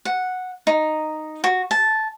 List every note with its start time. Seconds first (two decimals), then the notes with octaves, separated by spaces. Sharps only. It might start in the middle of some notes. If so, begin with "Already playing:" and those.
0.05 F#5
0.67 D#4
1.44 F#4
1.71 A5